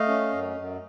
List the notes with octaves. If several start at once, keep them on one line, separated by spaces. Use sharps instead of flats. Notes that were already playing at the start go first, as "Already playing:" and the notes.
Already playing: A3 D#5 F5
C#4
F#2
F#2